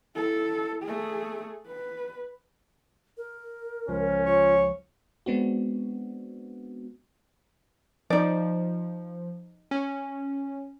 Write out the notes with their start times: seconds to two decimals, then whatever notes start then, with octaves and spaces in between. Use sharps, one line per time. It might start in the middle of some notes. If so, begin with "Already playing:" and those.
0.15 E4 A4
0.83 A3 G#4
1.67 B4
3.17 A#4
3.88 C#2 F3 C#4
4.26 F4 C#5
5.26 G#3 B3 C4 D4 F#4
8.10 F3 D#4 D5
9.71 C#4